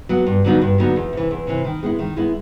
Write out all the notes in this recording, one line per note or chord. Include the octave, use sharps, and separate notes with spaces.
F#3 B3
G2
D3 F#3 B3 D#4
G2
D3 F#3 B3 D#4
E2
C3 E3
E2
C3 E3
D#3
G#3 B3 E4
D#3
G#3 B3 E4